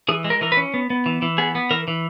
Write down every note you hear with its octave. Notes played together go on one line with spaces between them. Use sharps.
E3 G#4
G#3
A#4
E3 A#4
B4
C#4
B3
B3
E3
E3
B3 G#4
B3
E3 A#4
E3